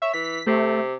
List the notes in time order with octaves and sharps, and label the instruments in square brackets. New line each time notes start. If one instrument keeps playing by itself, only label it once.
[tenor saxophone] C#5 [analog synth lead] E5
[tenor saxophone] E3 [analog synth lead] B6
[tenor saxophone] C3 [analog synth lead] A3